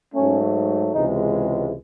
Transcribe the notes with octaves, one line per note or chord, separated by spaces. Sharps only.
G#2 F#3 A3 C#4
C#2 C3 E3 G#3 D#4